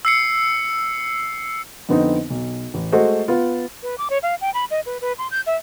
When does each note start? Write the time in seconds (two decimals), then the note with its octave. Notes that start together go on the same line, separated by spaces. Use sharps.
0.05 E6 C7 C#7
1.89 F2 D3 B3 C4 D#4
2.30 B1
2.74 A1
2.92 G#3 A3 F#4 A4 C5 D#5
3.28 B3 F4
3.83 B4
3.98 D6
4.10 C#5
4.23 F5
4.41 G5
4.54 B5
4.71 D#5
4.86 B4
5.01 B4
5.18 C6
5.31 G6
5.47 E5